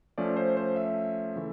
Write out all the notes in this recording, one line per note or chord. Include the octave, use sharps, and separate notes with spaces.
F3 A3 C#4 D5
C5
C5
E5
C#3 E3 A3